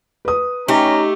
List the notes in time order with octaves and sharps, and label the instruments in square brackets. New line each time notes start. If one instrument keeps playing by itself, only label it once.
[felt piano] B4 D#6
[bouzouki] A3 G4 [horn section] C#4 A#5 [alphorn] D#4